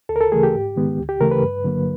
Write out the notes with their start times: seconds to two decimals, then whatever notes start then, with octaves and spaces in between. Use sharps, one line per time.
0.09 D2 A4
0.16 A#4
0.21 A4
0.32 C#3 E3 A3 G#4
0.43 G4
0.55 G#2
0.77 D#3 G#3 B3
0.99 D2
1.09 G4
1.20 C#3 E3 A3 A#4
1.31 B4
1.42 G2
1.64 D3 F#3 A#3